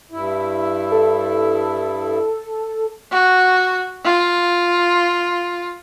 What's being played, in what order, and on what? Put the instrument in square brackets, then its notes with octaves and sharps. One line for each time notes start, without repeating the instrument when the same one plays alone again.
[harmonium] G2 E4
[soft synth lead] A4
[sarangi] F#4
F4